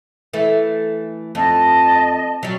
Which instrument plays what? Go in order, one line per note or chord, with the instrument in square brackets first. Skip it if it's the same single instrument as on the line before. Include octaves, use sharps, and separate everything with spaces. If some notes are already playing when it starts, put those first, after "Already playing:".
[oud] E3 A3
[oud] F2 [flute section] D#5 A5
[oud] F#3 G3